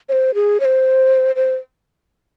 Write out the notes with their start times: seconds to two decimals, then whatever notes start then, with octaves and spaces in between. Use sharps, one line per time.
0.09 C#5
0.12 C5
0.35 G#4
0.60 C#5
0.65 C5
1.36 C5